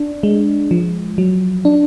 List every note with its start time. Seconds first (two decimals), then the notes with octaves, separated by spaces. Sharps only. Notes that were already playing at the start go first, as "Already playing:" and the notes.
Already playing: D4
0.23 G#3
0.71 F3
1.18 F#3
1.65 D4